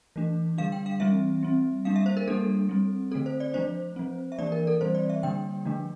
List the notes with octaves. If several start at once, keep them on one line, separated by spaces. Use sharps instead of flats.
E3 A3 D4
D3 G3 D4 F5
G5
F5
E3 G3 C4 E5
G3 C4
G3 A#3 D4 F5
E5
C5
A#4
G3 A#3 D4 A4
G3 C4
D3 A3 C4 A4
C5
D5
F3 A3 D4 C5
F3 C4
E5
E3 A#3 D4 D5
A#4
A4
E3 G3 C4 C5
D5
E5
D3 G3 A#3 D4 G5
D3 F3 A3 D4